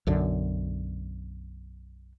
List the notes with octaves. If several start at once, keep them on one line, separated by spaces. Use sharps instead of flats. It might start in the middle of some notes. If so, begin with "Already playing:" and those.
B1 F#2 D3